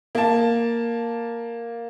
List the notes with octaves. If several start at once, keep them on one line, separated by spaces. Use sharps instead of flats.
A#3 A5